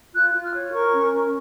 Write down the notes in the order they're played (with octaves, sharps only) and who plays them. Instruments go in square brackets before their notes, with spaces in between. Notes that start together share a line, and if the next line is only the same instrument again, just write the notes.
[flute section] F4 F#6
F4
F6
C#5
A#4 C#6
C#4
A#4